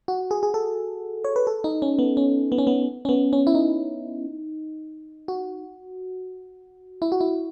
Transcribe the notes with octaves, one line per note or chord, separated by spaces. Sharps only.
F#4
G#4
G#4
A4
C#5
B4
A4
D#4
C#4
B3
C#4
B3
C#4
B3
C#4
B3
C#4
E4
D#4
F#4
E4
F#4
E4